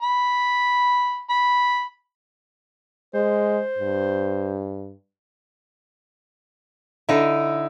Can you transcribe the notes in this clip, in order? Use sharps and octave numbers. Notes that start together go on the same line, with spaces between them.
B5
B5
G#3 C5
G2
D3 D#4 E4